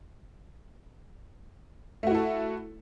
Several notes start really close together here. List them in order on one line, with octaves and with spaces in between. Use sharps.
A3 F#4 E4 A4